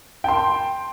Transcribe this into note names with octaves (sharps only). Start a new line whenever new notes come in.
G5 A5 C6